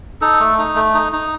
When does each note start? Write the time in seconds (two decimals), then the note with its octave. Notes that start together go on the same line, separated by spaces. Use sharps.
0.21 D#4 A4
0.40 A3
0.58 D#4
0.76 A3
0.94 D#4
1.13 D#4